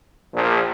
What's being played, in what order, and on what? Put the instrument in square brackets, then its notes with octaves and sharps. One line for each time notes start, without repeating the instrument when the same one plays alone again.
[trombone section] A#1